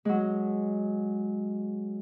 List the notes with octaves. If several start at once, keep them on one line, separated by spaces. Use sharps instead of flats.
F#3 G#3